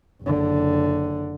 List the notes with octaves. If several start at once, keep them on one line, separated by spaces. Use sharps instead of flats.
F#1 D3